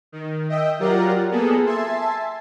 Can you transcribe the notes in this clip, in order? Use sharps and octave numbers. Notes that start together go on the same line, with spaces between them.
D#3
D#5 E5 G5
F#3 F4 G4 A#4 D5 F#5
A#3 B3 G#4 A4
E5 G#5 A5 C6